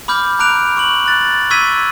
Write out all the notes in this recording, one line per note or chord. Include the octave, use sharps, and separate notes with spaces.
B5 D6 F6 G6
A#5 D6 F#6 D7 F7
C#6 F#7
F#6 A6
C#6 E6 G#6 B6 D#7